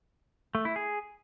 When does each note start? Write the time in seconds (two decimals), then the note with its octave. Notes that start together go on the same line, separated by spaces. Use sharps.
0.55 A3
0.65 E4
0.76 G#4